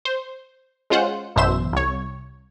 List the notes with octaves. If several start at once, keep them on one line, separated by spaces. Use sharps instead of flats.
C5
G#3 C#4 F4 C5 F#5
A1 F#2 B2 C5 E5 E7
C2 C#5